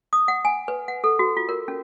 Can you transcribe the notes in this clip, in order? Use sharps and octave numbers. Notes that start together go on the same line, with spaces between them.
D#6
F#5
G#5
B4
F#5
A4
F#4
F4
A#4
C#4